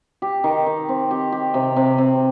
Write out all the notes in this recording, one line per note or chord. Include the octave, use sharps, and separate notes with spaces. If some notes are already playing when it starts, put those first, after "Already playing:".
G4
D#3
D#3
C4
G4
G4
C3
C3
C3